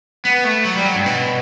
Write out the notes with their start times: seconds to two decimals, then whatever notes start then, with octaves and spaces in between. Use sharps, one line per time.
0.25 B3
0.44 A3
0.65 F#3
0.75 G3
0.85 F#3
0.95 G2
1.06 B2